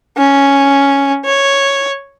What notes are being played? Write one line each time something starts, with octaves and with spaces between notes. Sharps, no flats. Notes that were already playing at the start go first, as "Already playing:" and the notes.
C#4
C#5